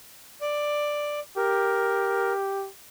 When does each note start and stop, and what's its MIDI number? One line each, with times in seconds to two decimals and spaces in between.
0.41 1.20 74
1.37 2.69 67
1.37 2.33 70